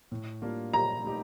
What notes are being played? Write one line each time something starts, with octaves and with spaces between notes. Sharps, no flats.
A2
G3 A#3 D4 F4
A#2 A#5
A3 D#4 G4